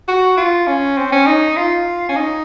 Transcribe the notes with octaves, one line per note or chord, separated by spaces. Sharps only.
F#4
F4
C#4
C4
C#4
D#4
F4
C#4
D#4